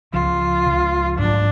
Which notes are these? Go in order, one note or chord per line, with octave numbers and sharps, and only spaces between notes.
C#2 C#3 F3 F4
C#2 C#3 F3
A1 G#2 F#3 D4